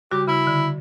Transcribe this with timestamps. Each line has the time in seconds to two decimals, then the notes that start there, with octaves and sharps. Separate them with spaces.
0.12 C#3 G3 F#4 G4
0.28 C#3 E4
0.47 D3